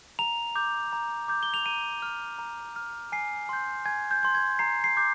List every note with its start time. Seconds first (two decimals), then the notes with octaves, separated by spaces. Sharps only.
0.19 A#5 F7
0.55 D6 G6
0.93 A#5
1.28 D6 G6
1.43 G7
1.54 F7
1.66 A#5 D#7
2.02 F6
2.39 A#5
2.76 F6
3.12 G#5 C7
3.49 C6 G6
3.85 G#5 G#6
4.11 G6
4.23 C6 G6
4.35 G#6
4.59 A#5 C7
4.84 C7
4.97 D6 G6